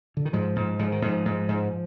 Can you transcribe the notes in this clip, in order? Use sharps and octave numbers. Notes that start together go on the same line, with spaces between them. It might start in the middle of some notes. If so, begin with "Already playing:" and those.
D3
D#3
G#2 F3
G#2
G#2 F3
D#3
G#2 F3
G#2
G#2